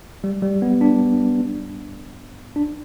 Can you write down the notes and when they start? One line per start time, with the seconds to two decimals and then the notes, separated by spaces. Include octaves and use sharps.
0.24 G3
0.42 G3
0.62 B3
0.81 D4
2.56 D4